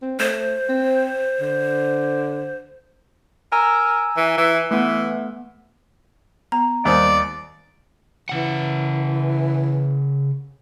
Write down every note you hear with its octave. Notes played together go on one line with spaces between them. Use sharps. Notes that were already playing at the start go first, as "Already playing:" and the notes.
C4
A3 C5
C4
D3
A#4 G#5 A#5 E6
E3
E3
E3 A3 B3
B3 A#5
D#2 D#3 G3 C5 D5
C#3 E3 F#5